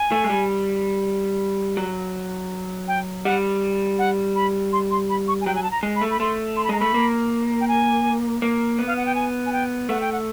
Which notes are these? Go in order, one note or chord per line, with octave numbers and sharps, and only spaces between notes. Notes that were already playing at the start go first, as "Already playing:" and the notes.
Already playing: G#5
A3
G#3
G3
F#3
G5
G3 F#5
F#5
B5
C6
C6
B5
C#6
G#5
F#3 G5
G#5
A5
A#5
G#3
B5
A3
B5
A3 C6
C6
B5
G#3 A#5
A3 B5
A#3
G5
G#5
A#3
B3
F5
F#5
G5
G#5
G#5
G5
A3 F#5
G5
F#5